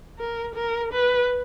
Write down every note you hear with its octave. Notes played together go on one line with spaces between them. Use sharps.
A#4
A#4
B4